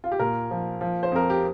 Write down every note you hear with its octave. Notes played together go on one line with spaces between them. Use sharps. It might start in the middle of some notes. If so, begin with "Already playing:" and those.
F4
G4
A#2 A#4
F3
F3
C5
F2 A#4
G4